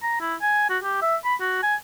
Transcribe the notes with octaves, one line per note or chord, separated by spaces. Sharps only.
A#5
E4
G#5
F#4
G4
E5
B5
F#4
G#5